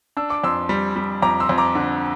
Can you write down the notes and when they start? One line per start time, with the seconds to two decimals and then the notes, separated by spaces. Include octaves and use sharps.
0.17 D4 E6
0.30 D6
0.44 F2 C6 E6
0.69 G3
0.96 G3
1.22 F2 A#5 D6
1.40 C6 E6
1.49 F2
1.58 A#5 D6
1.75 D3